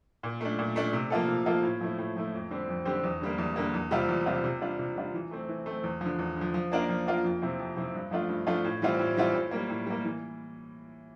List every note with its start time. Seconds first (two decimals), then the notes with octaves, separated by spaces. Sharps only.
0.23 A#2
0.41 A3 D4
0.58 A#2
0.76 A3 D4
0.93 C3
1.10 F3 A#3 F4 A4
1.28 C3
1.46 F3 A#3 F4 A4
1.63 A2
1.81 F3 A3 E4
1.98 A2
2.16 F3 A3 E4
2.34 F2
2.51 D3 G3 C4 G4
2.68 F2
2.85 D3 G3 C4 G4
3.03 E2
3.21 D3 G3 A#3
3.38 E2
3.56 D3 G3 A#3
3.74 E2
3.91 C3 G3 C4 F4
4.09 E2
4.26 C3 G3 C4 F4
4.44 C3
4.61 G3 D4 F4
4.79 C3
4.96 G3 D4 F4
5.14 E3
5.31 A3 C4
5.49 E3
5.66 A3 C4
5.84 E2
6.01 D3 F3
6.19 E2
6.36 D3 F3
6.54 F3
6.72 A#3 D4 F4 A#4
6.89 F3
7.07 A#3 D4 F4 A#4
7.24 F2
7.42 C3 F3 C4 E4
7.59 F2
7.76 C3 F3 C4 E4
7.94 G2
8.11 F3 A3 D4 F4
8.29 G2
8.47 F3 A3 D4 F4
8.64 A2
8.82 E3 G3 C4 F4
8.99 A2
9.17 E3 G3 C4 F4
9.34 A2
9.51 G3 A#3
9.69 A2
9.87 G3 A#3
10.05 E3